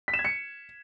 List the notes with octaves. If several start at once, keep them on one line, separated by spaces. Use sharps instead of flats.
B6
E7
G#6
C#7